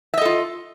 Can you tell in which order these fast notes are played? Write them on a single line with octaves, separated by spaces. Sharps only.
E5 D#5 A4 F4